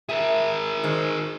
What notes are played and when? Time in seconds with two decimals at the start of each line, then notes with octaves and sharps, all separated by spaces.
0.09 G#4 A#4 E5
0.83 D#3 G#3 C5